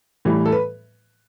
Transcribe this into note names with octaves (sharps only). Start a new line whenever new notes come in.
A2 E3 G3
A4
B4